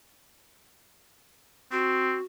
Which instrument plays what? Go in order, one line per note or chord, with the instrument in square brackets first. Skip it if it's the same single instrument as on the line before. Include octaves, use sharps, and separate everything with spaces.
[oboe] C4 [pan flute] F#4